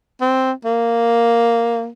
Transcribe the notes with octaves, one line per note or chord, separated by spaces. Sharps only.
C4
A#3